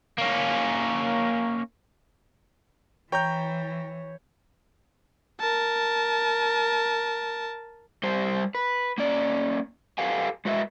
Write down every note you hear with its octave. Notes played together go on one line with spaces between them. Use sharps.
A#3 C#4
E3 C#5 G5 A#5 G6
A#4 A5
G3 G4 C5
B4
A#3 C#4 D5
G4 A4 B4 F5 F#5 G#5
G#3 F#4 B4 D#5 E5